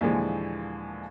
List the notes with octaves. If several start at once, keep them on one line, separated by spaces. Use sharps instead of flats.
D#2 A#2 D3 E3 F3 G#3